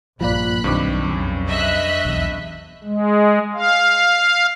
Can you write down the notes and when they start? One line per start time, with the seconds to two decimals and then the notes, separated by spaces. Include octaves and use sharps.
0.21 A#1 G2 A#2 F3 F4 D5 B5 F#6
0.64 B1 G2 D#3 C4 D#4 D6
1.06 F2 C#3
1.47 D#5 E5 F#6
2.05 B1 E2
2.84 G#3
3.54 F5